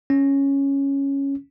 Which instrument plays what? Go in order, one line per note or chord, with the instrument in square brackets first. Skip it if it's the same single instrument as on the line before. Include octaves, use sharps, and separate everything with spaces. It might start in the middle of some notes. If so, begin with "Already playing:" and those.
[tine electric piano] C#4